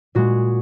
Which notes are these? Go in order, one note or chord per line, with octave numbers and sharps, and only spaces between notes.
A#2 G#3 F#4